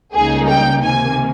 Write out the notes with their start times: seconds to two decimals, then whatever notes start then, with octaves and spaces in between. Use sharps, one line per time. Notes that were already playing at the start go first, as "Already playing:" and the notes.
0.14 C#2 C#3 G3 A#3 D#4 G#4
0.49 G5
0.83 C3 D#3 A#3 G#5